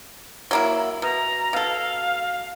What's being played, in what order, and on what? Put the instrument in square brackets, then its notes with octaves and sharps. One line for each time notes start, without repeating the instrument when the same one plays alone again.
[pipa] F#3 A#3 E4
[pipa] B2 [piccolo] A#5
[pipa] B2 A4 [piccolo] F5